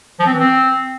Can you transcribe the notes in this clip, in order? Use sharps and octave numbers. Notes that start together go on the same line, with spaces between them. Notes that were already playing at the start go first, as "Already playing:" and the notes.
F3
C4
E3
C4